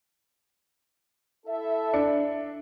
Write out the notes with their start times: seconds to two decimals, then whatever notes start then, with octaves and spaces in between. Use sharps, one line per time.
1.46 E4 A4 E5
1.93 D4 C#7